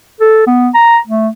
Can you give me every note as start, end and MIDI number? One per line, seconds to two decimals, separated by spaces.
0.21 0.43 69
0.47 0.69 59
0.74 0.98 82
1.07 1.29 57